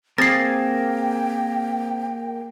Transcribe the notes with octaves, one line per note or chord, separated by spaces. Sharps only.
A#3 C4 G#4 A#4 G5 A6 C7